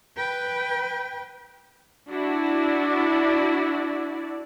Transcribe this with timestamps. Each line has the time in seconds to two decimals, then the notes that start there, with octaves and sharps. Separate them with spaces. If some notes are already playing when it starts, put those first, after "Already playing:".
0.17 B4 G5
2.10 D4 E4 F#4 D5